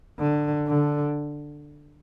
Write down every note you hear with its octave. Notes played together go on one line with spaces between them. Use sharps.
D3
D3